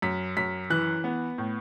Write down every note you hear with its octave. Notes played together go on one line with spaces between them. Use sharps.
F#2 B6
F#2 B6
E3 F#6
B3
A2